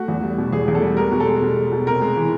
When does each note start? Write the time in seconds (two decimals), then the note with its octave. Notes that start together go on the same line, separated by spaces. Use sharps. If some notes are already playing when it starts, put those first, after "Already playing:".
Already playing: A3 F#4
0.08 E2
0.23 G3
0.38 B2
0.52 E2 G#4
0.68 E2
0.75 A4
0.82 G3
0.97 G#3 A#4
1.12 B2
1.20 A4
1.27 G#3
1.42 B2
1.57 G#3
1.72 B2
1.87 C3 A#4
2.02 G#3
2.17 E3